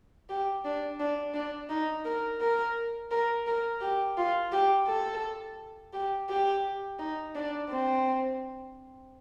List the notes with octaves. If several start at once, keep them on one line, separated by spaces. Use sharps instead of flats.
G4
D4
D4
D4
D#4
A#4
A#4
A#4
A#4
G4
F4
G4
A4
G4
G4
D#4
D4
C4